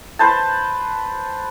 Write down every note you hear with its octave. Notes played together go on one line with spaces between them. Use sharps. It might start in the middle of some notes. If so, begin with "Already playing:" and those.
B4 C5 A5